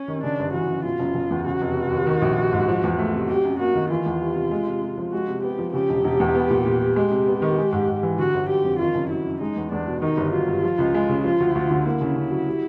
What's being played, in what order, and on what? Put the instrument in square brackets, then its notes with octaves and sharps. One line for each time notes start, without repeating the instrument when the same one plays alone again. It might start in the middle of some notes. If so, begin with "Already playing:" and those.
Already playing: [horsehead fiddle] C#4
[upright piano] D#3
[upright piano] C#3 [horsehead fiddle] D4
[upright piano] G1
[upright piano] E3 [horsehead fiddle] F#4
[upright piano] F#2
[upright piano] B2 [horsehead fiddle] F4
[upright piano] F#1
F#1
E2
[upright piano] C#3 [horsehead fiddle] F#4
[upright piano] F1
F1
D#2
D#3
A#1
G3
G#2
F3
E2
A3
C3
[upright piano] F#3 [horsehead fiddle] G4
[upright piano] F#2
[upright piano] A#3 [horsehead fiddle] F#4
[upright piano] D#3
[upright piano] E3 [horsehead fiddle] F4
[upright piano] E2
G3
C3
G#3
C3
C3
F3
[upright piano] G#3 [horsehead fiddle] F#4
[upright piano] C3
[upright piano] B3 [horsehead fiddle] G4
[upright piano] F3
[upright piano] C#3 [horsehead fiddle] G4
[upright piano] E1
E1
E2
B3
A#2
A#2
G3
[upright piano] G#3 [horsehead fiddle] G4
[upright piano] C3
B3
D#3
G#3
G#2
G#2
E3
[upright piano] D3 [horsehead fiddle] F#4
[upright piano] G1
[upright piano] F#3 [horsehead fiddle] G4
[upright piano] F2
[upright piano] D#3 [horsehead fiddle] F4
[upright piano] F#1
[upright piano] F#3 [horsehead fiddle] E4
[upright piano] F#2
[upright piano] G#3 [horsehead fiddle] D#4
[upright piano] E2
[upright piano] E2 [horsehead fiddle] D4
[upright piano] B2
[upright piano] D#3 [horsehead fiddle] D#4
[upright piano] G1
[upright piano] F#3 [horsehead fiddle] F4
[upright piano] G2
F3
C#2
G#3
C#3
[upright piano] F3 [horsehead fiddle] F4
[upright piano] D2
D2
D3
[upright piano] A#3 [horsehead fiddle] E4
[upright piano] C#3
C#3
F#3
G3